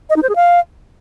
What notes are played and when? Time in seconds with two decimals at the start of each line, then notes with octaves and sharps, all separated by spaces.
0.10 D#5
0.16 D#4
0.23 C5
0.29 G#4
0.36 F5